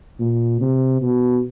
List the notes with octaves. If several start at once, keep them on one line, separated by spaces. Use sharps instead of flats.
A#2
C3
B2